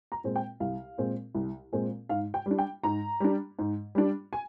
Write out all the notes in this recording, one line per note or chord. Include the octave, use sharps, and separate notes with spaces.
A#5
A#2 G#3 C4
G5
C2 F5
A#2 G#3 C4
C2
A#2 G#3 C4
G#2 F5
G5
G3 D4
G5
G#2 A#5
G3 D4
G#2
G3 D4
G#5